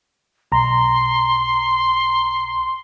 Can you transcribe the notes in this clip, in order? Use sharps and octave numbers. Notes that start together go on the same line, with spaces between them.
B1 A#5 C6